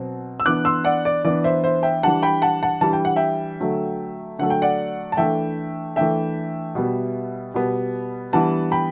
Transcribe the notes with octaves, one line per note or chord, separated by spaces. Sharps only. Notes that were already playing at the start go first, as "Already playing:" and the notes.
Already playing: B2 F#3 C4
E6
E3 B3 D4 D6 F#6
C6 E6
D5 F#5
D5
E3 B3 D4 D5
C5 E5
C5 E5
E5 G5
E3 G3 D4 F#5 A5
G5 B5
F#5 A5
F#5 A5
E3 G3 D4 A5
G5
F#5
E5 G5
D3 F#3 A3
D3 F#3 A3 F#5
G5
D5 F#5
A5
E3 A3 D4 E5 G5
E3 A3 D4 E5 G5
B2 G3 B3
B2 G3 B3
E3 G3 B3 D4 F#5 A5
G5 B5